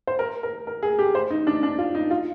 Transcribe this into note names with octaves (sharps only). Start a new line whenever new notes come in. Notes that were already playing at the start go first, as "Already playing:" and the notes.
C5
A#4
A#4
A#4
G#4
G4
C5
D#4
D4
D4
F4
D#4
F4